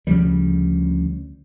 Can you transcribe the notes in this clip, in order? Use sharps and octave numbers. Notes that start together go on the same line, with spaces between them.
D2 C#3 F3 G3